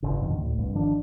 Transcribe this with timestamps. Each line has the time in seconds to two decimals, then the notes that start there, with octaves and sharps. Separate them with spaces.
0.02 G1 C#3
0.22 F2 B2 D3 D#3
0.36 D2 A2
0.58 C2 G2
0.74 G1 D#3 F3 D4